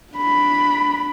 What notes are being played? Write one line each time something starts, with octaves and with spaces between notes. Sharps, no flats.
D4 B5